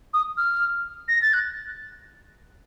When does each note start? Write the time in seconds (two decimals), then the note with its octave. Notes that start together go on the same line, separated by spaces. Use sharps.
0.14 D#6
0.37 F6
1.08 A#6
1.22 A6
1.33 F#6